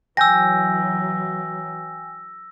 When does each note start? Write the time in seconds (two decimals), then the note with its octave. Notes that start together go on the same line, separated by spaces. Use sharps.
0.17 E3 F#3 G5 G#5 E6 G6 A#6